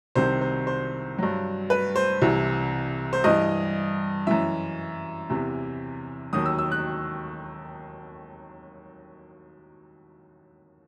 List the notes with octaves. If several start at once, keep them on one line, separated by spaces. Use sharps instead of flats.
C2 C3 D#3 C5
C5
C5
G2 F#3
B4
C5
C2 C3 E3
C5
G2 E3 D#5
F#2 E3 E5
E2 C3 E3
D#2 D#3 F#3 D#6
E6
E6
F#6